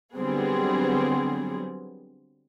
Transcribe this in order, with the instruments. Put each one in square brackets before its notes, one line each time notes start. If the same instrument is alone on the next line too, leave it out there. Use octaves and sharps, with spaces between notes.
[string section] D3 F#3 G3 B3 C4 G#4